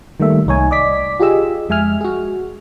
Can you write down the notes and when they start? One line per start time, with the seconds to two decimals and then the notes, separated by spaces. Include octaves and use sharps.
0.20 D#3 G3 A3 A#3 E5
0.47 C2 D#4 C#5 G#5
0.71 D5 D#5 D6 B6
1.20 F4 G4 G#4 D#5 E6
1.69 F2 G#3 E5 G#5 F6
2.01 F#4 G#4